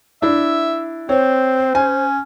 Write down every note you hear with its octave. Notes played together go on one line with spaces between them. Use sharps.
D4 E4 E5
C4 C5 C#5
C#4 G#5